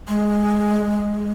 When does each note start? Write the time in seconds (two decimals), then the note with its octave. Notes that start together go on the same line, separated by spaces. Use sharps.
0.08 G#3